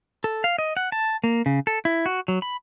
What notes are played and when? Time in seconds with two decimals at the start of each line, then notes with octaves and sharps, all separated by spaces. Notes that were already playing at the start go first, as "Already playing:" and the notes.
0.24 A4
0.44 F5
0.59 D#5
0.77 F#5
0.92 A5
1.24 A#3
1.46 C#3
1.67 A4
1.85 E4
2.06 F#4
2.28 F#3
2.42 B5